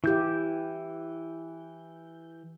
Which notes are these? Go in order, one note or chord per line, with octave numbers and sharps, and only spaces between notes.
E3 E4 G4 G6